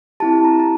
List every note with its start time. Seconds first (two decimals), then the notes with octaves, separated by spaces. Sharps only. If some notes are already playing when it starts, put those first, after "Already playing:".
0.20 C4 E4 G4 A5
0.44 A#5
0.60 A5